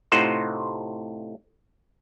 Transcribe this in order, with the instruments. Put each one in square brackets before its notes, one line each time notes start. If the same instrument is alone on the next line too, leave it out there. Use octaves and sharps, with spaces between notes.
[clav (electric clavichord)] A2 C3 D#4 F4 C5 F#5